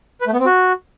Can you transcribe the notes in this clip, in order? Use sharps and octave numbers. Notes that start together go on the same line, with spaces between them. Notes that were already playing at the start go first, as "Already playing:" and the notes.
B4
A3
B3
C4
F#4